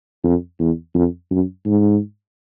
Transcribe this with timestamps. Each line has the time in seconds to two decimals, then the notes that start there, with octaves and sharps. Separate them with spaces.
0.24 F2
0.59 E2
0.94 F2
1.31 F#2
1.66 G#2